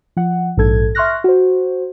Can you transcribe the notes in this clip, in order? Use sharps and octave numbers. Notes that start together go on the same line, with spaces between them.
F3 F#5
A#1 G#2 A4 G#6
E5 C6 C#6 F6 F#6 A#6
F#4 C5